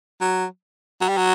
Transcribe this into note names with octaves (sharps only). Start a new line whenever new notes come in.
F#3
F#3
G3
F#3